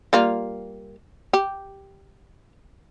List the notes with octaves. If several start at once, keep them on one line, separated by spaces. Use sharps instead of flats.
G3 A#3 F4
G4